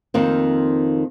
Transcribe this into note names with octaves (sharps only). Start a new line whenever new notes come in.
F2 D#3 A#3 C4